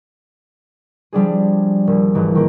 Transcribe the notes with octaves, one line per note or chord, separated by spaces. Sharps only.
F3 G3 D4 G#4
D#1
G#1 G#2 E3
D#3 A#3